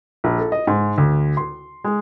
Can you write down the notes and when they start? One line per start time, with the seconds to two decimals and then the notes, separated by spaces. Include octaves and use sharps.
0.24 A#1
0.39 A4
0.52 D#5
0.67 G#2
0.98 D2
1.37 C6
1.84 G#3